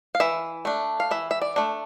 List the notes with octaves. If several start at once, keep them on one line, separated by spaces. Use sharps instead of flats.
F5
E3 E5
A3 D4
F5
E3 E5
E5
D5
A3 D4